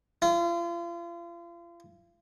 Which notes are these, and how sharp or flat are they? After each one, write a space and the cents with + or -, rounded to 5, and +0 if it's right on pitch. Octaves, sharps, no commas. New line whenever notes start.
F4 -35